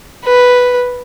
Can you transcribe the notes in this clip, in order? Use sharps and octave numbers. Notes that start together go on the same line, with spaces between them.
B4